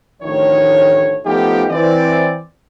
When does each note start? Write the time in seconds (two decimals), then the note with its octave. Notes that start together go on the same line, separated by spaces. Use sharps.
0.22 A1 D2 D#3 F3 C#5
1.26 F3 A3 B3 D#4 F4 G4
1.70 E3 C4 D5